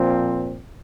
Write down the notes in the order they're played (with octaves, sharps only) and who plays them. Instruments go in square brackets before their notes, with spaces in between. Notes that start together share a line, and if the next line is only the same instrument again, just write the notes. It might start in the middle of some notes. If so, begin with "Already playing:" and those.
Already playing: [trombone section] A#2 F3 C4